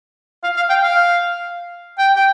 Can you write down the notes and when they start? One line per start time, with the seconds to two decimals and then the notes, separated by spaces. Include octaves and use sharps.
0.44 F5
0.57 F5
0.70 G5
0.82 F5
1.99 G5
2.16 G5